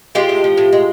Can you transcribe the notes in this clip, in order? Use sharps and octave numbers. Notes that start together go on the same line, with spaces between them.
G#3 F4 G4
A2
F3
A2
G#3